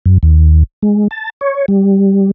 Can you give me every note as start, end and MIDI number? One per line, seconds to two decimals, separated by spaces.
0.06 0.18 42
0.23 0.63 39
0.82 1.08 56
1.11 1.30 81
1.41 1.66 73
1.68 2.31 55